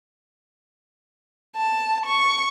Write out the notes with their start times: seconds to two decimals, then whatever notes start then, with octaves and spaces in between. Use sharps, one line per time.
1.57 A5
2.06 C#6